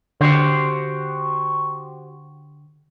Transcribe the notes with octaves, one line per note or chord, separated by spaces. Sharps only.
D3 F#4 G4 C5